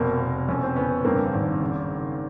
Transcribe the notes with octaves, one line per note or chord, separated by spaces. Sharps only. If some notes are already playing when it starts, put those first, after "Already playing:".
Already playing: F1 B2 A#3 C4
B2
F2 C#4
C4
C#3 B3 C#4
G2 A#3 C4
G#1
C#3